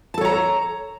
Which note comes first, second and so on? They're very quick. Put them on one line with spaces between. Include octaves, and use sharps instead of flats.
A5 A4 C#5 A#5